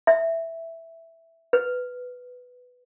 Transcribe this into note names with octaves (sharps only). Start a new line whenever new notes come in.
E5
B4